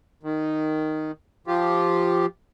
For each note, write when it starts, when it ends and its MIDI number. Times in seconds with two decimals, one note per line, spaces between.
0.23 1.11 51
1.47 2.26 53
1.47 2.26 65
1.47 2.26 67